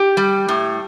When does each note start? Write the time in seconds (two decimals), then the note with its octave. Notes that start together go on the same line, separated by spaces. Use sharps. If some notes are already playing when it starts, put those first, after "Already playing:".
Already playing: G4
0.17 G3
0.48 A2